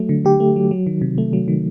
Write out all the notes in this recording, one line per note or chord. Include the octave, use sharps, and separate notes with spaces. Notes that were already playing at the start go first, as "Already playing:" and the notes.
Already playing: F#3 A3
D3
D3 G4
A3
F#3
F#3
D#3
C3
A3
F#3
D#3